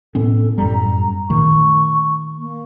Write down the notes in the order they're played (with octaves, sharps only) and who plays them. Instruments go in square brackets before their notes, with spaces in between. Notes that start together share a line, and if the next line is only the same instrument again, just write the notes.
[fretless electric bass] A2 B3 C#4 [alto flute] A4
[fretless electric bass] F#2 A2 G3 [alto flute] A#5
[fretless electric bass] A#2 D#3 A3 [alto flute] C#6
[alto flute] A#3